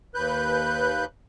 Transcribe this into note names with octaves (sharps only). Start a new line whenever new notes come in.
D#2 B4 F#6 G6